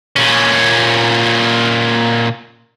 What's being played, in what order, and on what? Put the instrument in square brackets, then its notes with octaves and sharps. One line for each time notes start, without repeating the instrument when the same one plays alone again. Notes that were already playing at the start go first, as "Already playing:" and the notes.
[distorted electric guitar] A#2 C#4